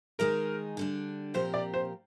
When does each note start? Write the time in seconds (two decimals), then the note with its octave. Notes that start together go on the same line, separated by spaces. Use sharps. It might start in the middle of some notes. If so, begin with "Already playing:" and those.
0.19 D#3 G#3 D#4 G#4 A#4
0.77 D3 G3 D4
1.34 A#2 F3 C4 G4 A#4 C5
1.54 D5
1.74 C5